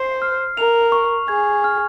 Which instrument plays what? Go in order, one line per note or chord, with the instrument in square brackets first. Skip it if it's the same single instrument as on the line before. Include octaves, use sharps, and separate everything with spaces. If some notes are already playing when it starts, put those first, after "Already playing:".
Already playing: [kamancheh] C5 [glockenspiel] C7
[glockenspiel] F6
[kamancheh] A#4 [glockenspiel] F7
[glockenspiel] C#6
[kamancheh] G#4 [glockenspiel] G#6
[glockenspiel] F6